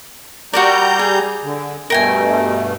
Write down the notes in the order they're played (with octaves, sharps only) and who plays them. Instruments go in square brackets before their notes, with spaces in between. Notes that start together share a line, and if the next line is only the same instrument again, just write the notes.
[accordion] G3 A#5 G6 [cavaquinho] F#4 A#4 D5
[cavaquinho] G#4
[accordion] D3
[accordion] G2 B2 A3 [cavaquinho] A#4 G5 G#5